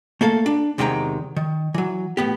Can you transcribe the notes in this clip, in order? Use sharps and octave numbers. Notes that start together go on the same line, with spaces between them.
A3 A#3 A4 F5
D4
E2 C3 D#3 G#3 G5 A#5
D#3
E3 F#3
A2 B3 G4